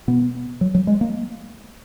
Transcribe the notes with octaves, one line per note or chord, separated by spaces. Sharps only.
B2 B3
F#3
F#3
G#3
A#3